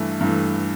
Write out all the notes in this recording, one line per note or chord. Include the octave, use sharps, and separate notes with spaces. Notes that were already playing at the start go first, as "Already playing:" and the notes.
Already playing: G2 E3 A3
G2 E3 A3